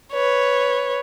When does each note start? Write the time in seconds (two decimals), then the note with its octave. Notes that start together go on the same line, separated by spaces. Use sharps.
0.12 B4 C#5